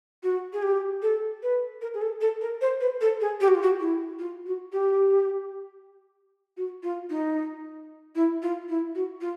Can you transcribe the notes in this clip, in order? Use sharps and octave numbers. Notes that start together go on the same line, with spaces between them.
F#4
G#4
G4
A4
B4
A#4
G#4
A4
A4
A#4
C5
B4
A4
G#4
G4
F#4
F4
F#4
E4
F4
F#4
G4
F#4
F4
D#4
E4
F4
E4
F#4
F4